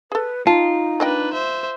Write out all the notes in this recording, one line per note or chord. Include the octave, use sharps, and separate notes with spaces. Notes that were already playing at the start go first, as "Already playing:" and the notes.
G#4 A4 B4
D#4 F4 A5
A#3 D4 B4 D#5 G5
C5 E5